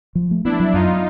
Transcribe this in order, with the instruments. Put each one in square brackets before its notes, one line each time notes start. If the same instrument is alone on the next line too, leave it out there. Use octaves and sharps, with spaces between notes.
[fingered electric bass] F3
A3
[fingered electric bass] B3 [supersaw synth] D4 E4
[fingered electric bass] F#3
[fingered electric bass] F#2 [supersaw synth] D#4 F4